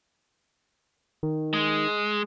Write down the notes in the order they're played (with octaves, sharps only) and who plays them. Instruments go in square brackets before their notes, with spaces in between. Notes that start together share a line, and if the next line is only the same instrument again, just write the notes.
[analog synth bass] D#3
[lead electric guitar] G#3